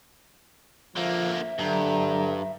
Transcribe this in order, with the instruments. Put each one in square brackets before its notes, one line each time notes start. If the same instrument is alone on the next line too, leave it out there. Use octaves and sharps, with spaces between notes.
[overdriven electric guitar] D3 A#3 [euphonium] F3 [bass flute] E5
[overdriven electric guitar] G2 [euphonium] D3 [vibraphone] F#3 A#5